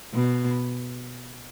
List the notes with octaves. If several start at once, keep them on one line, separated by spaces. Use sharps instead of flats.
B2